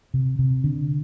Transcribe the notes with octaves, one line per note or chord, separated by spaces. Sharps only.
C3
C3
D3